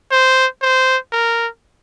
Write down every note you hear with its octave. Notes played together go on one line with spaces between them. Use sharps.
C5
C5
A#4